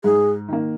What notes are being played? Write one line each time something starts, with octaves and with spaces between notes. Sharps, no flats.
G#2 G#4
D#3 A#3